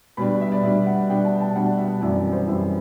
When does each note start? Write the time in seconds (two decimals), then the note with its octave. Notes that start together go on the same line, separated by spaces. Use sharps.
0.17 B2 G3 D4 B5
0.29 D5
0.41 E5
0.52 D5
0.63 B2 G3 D4 E5
0.86 F#5
1.10 B2 G3 D4 G5
1.25 A5
1.40 A5
1.55 B2 G3 D4 F#5
1.78 E5
2.01 F#2 E3 G3 C4 E4 D5
2.17 D5
2.32 C5
2.47 F#2 E3 G3 C4 E4